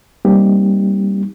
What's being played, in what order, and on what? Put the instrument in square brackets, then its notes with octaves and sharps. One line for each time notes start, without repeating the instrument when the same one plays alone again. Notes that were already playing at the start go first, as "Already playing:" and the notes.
[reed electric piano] G3 A#3 C4 D#4 G4